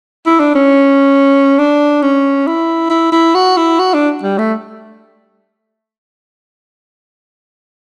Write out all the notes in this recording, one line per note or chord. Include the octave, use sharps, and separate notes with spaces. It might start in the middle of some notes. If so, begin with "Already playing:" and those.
E4
D4
C#4
D4
C#4
E4
E4
E4
F#4
E4
F#4
D4
G3
A3